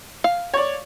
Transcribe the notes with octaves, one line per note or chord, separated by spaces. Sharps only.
F5
C#5 D5